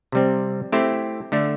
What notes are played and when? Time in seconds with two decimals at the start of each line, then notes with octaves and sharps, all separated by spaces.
0.12 C3 G3 C4
0.72 A3 C4 E4 G4 C5
1.32 D3 A3 D4